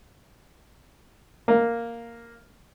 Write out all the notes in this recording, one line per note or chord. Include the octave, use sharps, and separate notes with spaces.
A#3